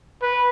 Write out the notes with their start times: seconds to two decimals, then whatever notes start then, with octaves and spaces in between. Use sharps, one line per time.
0.22 B4